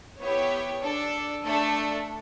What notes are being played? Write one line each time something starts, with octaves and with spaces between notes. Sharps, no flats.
B3 E4 G4 C#5
D4 A4
A3 D4 A4